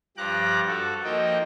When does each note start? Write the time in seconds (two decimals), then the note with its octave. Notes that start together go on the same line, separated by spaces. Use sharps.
0.17 G2 F3 G4 A#5 D6 F#6
0.68 F#4 A4
1.04 F3 A#3 D#4 D#5 G5